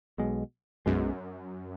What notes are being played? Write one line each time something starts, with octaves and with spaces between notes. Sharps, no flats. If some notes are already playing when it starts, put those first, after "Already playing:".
B1 B2 G#3
B1 F#2 B2 G#3 C#4